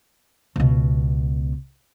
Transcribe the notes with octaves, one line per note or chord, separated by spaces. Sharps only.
C#2 B2